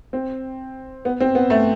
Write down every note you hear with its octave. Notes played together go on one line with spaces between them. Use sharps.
C4
B3
C4
B3
A3